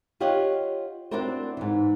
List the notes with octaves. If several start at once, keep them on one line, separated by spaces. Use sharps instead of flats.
F4 G4 C#5 D#5 F5 F#5
C4 D4 E4 F#4 A#4 C5
G#2 E3